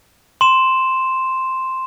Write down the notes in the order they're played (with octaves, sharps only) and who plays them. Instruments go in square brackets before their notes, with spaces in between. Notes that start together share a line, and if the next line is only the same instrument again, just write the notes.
[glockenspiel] C6 E7